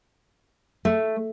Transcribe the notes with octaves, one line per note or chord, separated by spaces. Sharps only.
A3